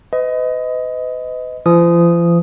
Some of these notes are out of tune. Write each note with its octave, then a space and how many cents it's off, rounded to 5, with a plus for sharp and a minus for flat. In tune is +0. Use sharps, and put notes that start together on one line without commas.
B4 +40 D#5 +15
F3 -40 D#6 -5